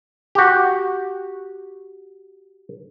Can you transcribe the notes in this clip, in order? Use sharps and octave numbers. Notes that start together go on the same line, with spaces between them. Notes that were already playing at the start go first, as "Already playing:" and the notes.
F#4 G4